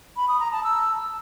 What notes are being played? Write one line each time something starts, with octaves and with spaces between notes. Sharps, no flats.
B5
D#6
A#5
A5
E6